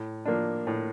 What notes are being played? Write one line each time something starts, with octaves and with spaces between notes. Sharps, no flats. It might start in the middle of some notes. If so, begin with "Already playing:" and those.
Already playing: A2
F3 A#3 D4
A2